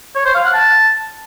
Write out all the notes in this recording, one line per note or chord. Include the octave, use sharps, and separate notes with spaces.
C#5
C5
F5
F#5
A5